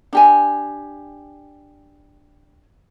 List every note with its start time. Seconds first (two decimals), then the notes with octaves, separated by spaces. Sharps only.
0.13 D4 G4 G#5